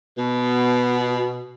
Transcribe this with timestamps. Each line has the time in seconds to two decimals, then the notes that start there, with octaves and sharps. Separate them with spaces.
0.18 B2